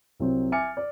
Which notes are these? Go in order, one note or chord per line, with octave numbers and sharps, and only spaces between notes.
C2 F#3 C4
E5 G#5 D6 F6 A6 C#7
D5